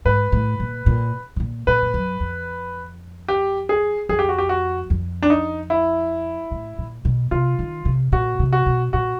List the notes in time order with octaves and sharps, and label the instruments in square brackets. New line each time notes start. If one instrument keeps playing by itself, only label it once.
[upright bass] G#2 [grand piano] B4
[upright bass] A2
A#2
A#2
B2
A#2
[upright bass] A#2 [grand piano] B4
[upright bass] F2
F#2
F2
[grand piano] G4
G#4
[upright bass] F2 [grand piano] G#4
[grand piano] G4
F#4
G4
F#4
[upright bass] F2
[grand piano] D4
D#4
E4
[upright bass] A2
A#2
B2
[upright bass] C3 [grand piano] F4
[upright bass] D#3
C3
[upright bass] A#2 [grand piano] F#4
[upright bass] C3
[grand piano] F#4
[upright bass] B2
[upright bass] A#2 [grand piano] F#4